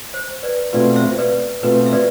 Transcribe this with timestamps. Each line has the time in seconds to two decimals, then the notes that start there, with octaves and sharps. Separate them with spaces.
0.14 C5
0.43 B4 D5
0.73 B2 A3 C4 F4 B4 D5
0.96 C5 E5
1.18 B4 D5
1.63 B2 A3 C4 F4 B4
1.86 E5
1.93 B4 D5